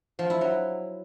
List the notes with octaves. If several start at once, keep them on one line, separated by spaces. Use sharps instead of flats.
F3
E4
F#3